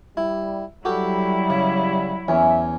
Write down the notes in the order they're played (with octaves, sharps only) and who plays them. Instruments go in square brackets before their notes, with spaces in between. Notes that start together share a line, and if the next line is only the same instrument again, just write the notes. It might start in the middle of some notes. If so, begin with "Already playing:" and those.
[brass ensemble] G3 [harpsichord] E4
[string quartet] F#3 E4 [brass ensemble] G3 [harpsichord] F#4 G4 A4
[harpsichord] C#3
[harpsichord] E2 [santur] C#4 [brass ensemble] E5